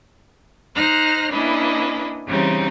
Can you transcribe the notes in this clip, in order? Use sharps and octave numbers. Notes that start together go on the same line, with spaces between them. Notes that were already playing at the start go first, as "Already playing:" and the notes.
D#4 C5 F6 F#6 A#6
A#3 C#4 D4 E4 B4 D#5
C#3 E3 G3 C4 D#4